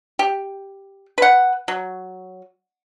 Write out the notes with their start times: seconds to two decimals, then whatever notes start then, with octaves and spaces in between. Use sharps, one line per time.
0.19 G4
1.18 B4 F#5
1.68 F#3